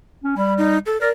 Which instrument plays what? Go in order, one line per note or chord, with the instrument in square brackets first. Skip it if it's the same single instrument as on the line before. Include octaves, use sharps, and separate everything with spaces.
[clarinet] C#4
[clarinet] G3 [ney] B5
[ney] D#4
A4
[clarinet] A#4 [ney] D5